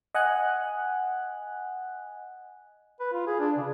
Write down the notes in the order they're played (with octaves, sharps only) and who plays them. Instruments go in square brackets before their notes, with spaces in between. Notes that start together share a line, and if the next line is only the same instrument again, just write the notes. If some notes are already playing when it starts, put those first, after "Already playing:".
[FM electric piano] D#5 F#5 G#5 F#6
[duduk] B4
F4
G#4
D4
C#3